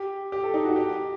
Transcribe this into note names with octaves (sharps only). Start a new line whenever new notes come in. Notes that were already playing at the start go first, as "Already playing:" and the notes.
Already playing: G4
G4
A4
D#4
F#4
G4